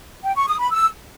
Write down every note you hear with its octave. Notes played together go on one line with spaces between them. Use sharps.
G5
C#6
D#6
B5
E6